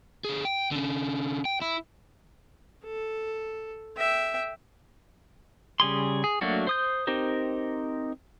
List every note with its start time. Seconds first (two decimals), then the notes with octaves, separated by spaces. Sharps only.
0.25 D3 G#4
0.45 G5
0.71 D3 C#4
1.45 G5
1.61 E4
2.85 A4
3.97 E5 G5
5.80 C#3 G3 G#4 C6
6.24 G#4
6.41 F#3 A3 A#3 D4 F#4
6.67 C5 D#6 G6
7.07 C4 D#4 G4 A#4 C5